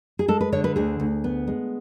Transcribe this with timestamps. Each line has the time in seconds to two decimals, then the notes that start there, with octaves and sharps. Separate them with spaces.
0.19 G#4
0.28 G#3 A4
0.41 B4
0.52 D3 C#5
0.64 B4
0.76 D2 G#4
1.00 D2
1.24 B3
1.47 G#3